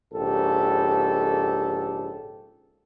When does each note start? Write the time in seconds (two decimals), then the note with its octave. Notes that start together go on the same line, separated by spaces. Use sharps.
0.13 A#1 G#2 C#3 G4 A4